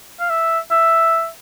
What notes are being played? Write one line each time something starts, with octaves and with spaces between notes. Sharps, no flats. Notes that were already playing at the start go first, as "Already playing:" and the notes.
F5
E5
E5